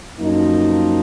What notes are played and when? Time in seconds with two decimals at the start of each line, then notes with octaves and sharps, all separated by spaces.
0.19 F#2 F3 A#3 D#4